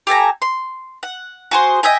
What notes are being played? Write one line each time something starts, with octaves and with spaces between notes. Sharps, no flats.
G4 A4 G#5 A#5
C6
F#5
F#4 G#4 C5
D#5 E5 G5 G#5